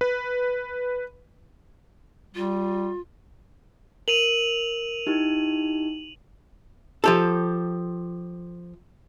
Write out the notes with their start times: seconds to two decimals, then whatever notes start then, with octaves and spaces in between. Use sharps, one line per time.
0.01 B4
2.35 G3 F4
4.08 A#4 D#7 F7 F#7
5.07 D#4 E4 G4
7.04 F3 G4 A4